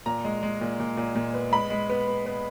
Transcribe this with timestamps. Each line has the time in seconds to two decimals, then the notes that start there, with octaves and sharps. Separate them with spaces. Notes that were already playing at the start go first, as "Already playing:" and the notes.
0.06 A#2 A#5
0.25 G#3
0.43 G#3
0.61 A#2
0.80 A#2
0.97 A#2
1.15 A#2
1.34 B3
1.52 G#3 B5
1.70 G#3
1.89 B3
2.08 B3
2.26 B3